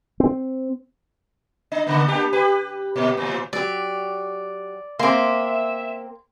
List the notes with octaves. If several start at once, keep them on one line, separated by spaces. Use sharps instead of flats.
C4
D4
C#3 A#3
A#3 D4 G4
G4 B4
A#2 A#3
A2 F3
F#3 G4 D5
A#3 C4 E5 C6 D6